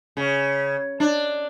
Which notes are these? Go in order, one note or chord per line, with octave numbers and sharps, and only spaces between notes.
C#3
D4